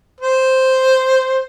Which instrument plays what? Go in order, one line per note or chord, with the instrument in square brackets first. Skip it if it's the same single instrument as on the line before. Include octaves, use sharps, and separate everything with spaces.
[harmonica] C5